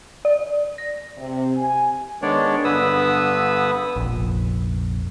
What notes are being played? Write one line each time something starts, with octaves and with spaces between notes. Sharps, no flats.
D5
A#6
C3
G#5
D#3 G#3 B3 D4 C#5 D5
G2 D3 B3 B4 D#6 E6
F1 A#1